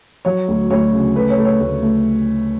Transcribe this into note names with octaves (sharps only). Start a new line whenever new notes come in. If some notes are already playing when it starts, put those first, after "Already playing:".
F#3 C#5
D2
D2 C#5
C#3
A3 B4
C#5
A3
C#5
D2
A3